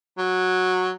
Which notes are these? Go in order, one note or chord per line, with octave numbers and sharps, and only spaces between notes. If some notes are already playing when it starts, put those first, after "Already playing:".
F#3